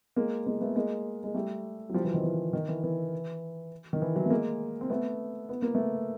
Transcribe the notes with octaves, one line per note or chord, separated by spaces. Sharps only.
G#3 A#3
G#3 A#3
A3 B3
G#3 A#3
G#3
G3 A3
F#3
F3 G3
E3 F#3
D#3 F3
E3
D#3
E3
E3
D#3
E3
E3 F#3
A3
G#3 A#3
C4
A3 B3
B3
A#3
A3 B3